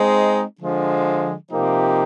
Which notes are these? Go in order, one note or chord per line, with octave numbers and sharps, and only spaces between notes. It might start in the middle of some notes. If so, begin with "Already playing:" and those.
Already playing: G#3 C4 D#4
D3 F3 G#3
C3 F3 A#3 D#4 G4